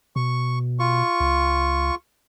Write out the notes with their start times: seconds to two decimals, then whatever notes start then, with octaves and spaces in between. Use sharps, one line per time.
0.16 B2 C#6
0.79 F4 C#6
1.20 C#2